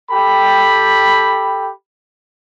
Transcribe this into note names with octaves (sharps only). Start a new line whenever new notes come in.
G4 A4 G5 B5